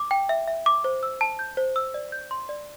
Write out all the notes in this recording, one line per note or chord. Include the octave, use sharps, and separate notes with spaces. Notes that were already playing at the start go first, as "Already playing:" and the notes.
Already playing: D6
G5
E5
E5
D6
C5
E6
A5
G6
C5
E6
D5
G6
C6
D5